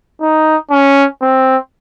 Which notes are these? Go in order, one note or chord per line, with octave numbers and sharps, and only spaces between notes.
D#4
C#4
C4